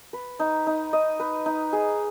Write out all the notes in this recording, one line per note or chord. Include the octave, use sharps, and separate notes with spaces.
B4
D#4
D#4
D#5
B4
D#4
G#4